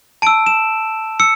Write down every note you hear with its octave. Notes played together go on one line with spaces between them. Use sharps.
A5 E6 D7
E7
E6 C#7